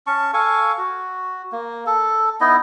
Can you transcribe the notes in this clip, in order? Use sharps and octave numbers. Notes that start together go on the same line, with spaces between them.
C#4 A5 C#6
A4 F5 G#5 C#6
F#4
A#3
A4
B3 D#4 E4 D#5